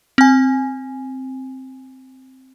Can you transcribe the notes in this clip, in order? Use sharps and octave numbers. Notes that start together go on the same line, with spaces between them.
C4 G#5